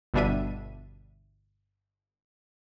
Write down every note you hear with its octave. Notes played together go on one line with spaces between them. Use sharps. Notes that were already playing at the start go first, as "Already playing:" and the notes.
G1 B2 G3 D4 E5 D#7